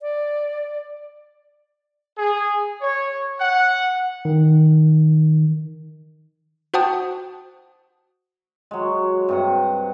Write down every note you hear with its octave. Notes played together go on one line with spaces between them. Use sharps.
D5
G#4
C#5
F#5
D#3
F#4 C5 F#5 G5 A5 D#6
F#3 G#3
G2 C3 F#5